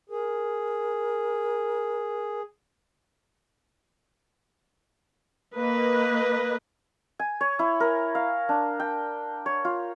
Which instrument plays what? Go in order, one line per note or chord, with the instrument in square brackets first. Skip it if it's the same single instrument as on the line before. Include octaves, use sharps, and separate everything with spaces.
[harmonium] G#4 [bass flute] A#4
[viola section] A#3 B4 D#5
[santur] G#5
C#5
E4
A#4
F5
D4
G5
C#5
F4